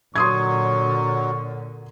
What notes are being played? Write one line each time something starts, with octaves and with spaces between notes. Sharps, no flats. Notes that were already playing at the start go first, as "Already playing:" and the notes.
A#2 D3 F#3 C6 C#6 D#6 G#6